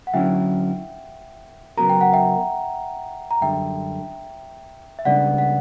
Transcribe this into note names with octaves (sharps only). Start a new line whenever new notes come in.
F#5
D3 F#3 C#4 E4 E5 G5
C#3 F#3 B3 F#4 A#4 A#5
G5
F#5
E5 G5
A#5
F#2 D3 G3 E5 G5
E5
C#2 C#3 G3 B3 D4 D5 F#5
F#5